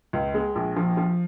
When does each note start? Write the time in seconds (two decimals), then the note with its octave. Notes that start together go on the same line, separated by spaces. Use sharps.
0.13 C#2
0.34 G#3
0.55 A#1
0.76 F3
0.97 F3